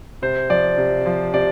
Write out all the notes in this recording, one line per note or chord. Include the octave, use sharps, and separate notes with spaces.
C3 C5
F3 D5
C3
F3
C3 D5